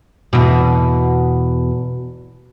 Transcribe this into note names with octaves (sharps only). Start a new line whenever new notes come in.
E2 B2